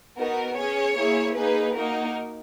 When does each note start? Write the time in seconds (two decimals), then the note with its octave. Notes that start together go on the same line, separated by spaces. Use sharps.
0.16 B3 D#4 F#4 A#4
0.56 C#4 G#4 C#5
0.95 A#3 E4 G#4
1.35 A#3 D#4 G#4 B4
1.74 A#3 D#4 F#4 A#4